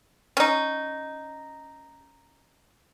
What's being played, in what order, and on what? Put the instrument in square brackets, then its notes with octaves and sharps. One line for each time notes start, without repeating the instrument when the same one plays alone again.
[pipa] C#4 D#4